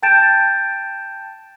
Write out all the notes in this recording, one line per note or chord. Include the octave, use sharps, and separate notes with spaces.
G5 A5 G6 A6 D7 E7